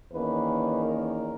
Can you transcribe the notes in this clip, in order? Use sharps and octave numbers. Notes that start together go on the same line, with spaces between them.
E2 D#3 A#3 C#4 B4
A#4